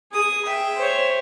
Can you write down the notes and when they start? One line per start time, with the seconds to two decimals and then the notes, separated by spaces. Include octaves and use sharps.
0.12 G#4 D#6
0.45 E5 G5
0.76 C5 C#5